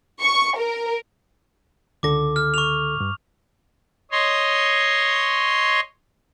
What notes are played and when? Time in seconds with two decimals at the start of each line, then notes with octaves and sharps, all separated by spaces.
0.21 C#6
0.57 A#4
2.03 C#2 D3 A4 D6 A#6
2.36 F6
2.54 C#6 F7
3.00 G2
4.11 C#5 D#5 C6